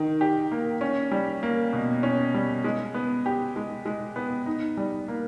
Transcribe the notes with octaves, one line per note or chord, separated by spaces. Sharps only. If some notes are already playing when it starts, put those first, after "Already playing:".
Already playing: D#3
G4
A#3
C#4
G3
A#3
B2
C#4
G3
G#3
B3
G4
G#3
G#3
B3
D#4
G3
A#3